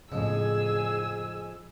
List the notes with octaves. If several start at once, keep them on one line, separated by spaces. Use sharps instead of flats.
F2 A2 C#3 F3 G#3 G#4 G#5 E6